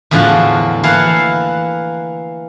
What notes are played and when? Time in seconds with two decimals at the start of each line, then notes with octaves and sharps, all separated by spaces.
0.11 E2 A2 D3 F3 F#4 A5
0.83 E3 A#3 E4 F5 F#5 A5